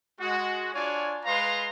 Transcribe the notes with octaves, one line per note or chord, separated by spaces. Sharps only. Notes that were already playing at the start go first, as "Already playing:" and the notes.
G#3 F#4
D4 F4 C#5 D5 G#5
G#3 B4 F5 A#5 C6